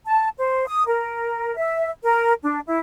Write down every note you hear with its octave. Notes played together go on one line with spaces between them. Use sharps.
A5
C5
D#6
A#4
E5
A#4
D4
E4